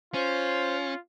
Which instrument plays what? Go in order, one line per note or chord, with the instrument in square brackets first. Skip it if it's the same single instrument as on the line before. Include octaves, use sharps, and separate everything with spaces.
[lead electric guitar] C#4 [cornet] F4 [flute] C5